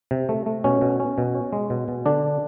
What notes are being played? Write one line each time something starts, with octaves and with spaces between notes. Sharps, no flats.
C3
A3
A3
B2 C#4
B2
C#4
B2
C#4
G#3
B2
B2
D3 D4